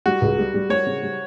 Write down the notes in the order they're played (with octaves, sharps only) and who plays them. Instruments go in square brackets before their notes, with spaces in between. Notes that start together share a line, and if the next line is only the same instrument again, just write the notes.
[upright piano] G3 [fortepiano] F#4
[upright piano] C#2
G3
G3
[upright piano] G3 [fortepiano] C#5
[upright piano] C#3
G3